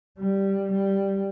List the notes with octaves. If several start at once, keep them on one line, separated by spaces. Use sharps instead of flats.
G3
G3